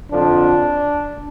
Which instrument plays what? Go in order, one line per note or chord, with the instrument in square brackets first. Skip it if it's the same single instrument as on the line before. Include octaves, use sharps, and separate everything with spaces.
[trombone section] F2 D3 F3 D4